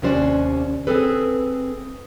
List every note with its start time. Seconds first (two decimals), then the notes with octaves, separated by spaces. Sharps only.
0.02 D#2 C3 C#4 D4 C5 D5
0.87 C4 G#4 A4 B4